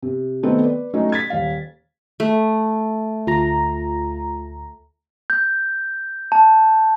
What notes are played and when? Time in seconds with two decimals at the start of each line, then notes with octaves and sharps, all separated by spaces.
0.02 C3
0.43 D#3 F#3 A3 B3 C4 A4
0.63 B4 D5
0.94 F#3 A3 C#4 D#4
1.12 G#6 A6 B6
1.30 D#1 F5
2.20 A3
3.27 D2 F4 A#5
5.30 G6
6.32 A5